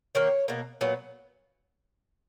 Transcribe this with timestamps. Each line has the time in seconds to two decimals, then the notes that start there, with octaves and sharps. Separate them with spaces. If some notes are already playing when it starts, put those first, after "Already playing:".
0.15 D#3 A#3 C#5
0.48 B2 A#3
0.81 A#2 F#3 B3